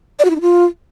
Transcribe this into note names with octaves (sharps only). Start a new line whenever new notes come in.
D5
F#4
E4
D#4
F4